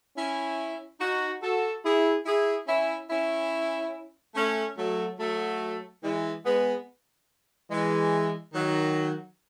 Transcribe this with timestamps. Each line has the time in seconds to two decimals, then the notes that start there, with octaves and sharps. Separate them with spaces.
0.16 C#4 E4
1.00 D#4 F#4
1.42 F#4 A4
1.84 E4 G#4
2.25 E4 G#4
2.67 C#4 E4
3.10 C#4 E4
4.35 A3 C#4
4.76 F#3 A3
5.19 F#3 A3
6.02 E3 G#3
6.44 G#3 B3
7.69 E3 G#3
8.54 D#3 F#3